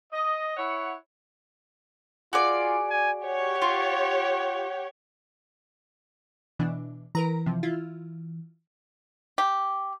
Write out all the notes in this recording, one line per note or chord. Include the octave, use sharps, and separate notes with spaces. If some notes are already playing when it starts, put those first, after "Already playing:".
D#5
E4 C#5 F#5
F4 F#4 G#4 D5
G#5
G4 C#5 F#5
F4
B2 E3 D4
E3 A#4 B4 A#5
C3 F3
E4 F4
G4